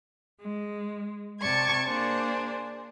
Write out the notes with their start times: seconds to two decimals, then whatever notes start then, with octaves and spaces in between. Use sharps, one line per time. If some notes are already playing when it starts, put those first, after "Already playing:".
0.41 G#3
1.40 C3 D5 A5 C#6 G#6
1.86 A#3 D4 G#4 C5